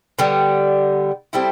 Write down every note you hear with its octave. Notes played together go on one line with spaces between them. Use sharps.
D3 G3 B3
G3 C4 E4 A4